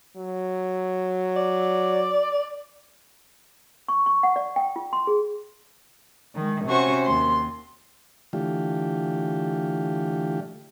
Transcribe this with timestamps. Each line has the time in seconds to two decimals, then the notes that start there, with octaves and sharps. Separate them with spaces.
0.17 F#3
1.37 D5
3.88 C#6
4.06 C#6
4.23 F#5
4.36 D5
4.56 G5
4.76 F4
4.93 C6
5.07 G#4
6.35 D#3 G#3
6.66 C3 C#4 F#4 C5 C#6
7.05 D#2 C6
8.33 D3 E3 A3 F4 G4